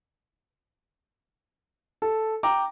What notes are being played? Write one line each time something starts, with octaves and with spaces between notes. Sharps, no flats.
A4
G5 A#5 D6